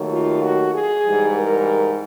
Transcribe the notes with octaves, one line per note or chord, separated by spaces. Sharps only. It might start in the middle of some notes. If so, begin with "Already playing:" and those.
Already playing: D#2 D#3 F#3 A3
F4
F#4
G#4
G#2 E3 G3
A#4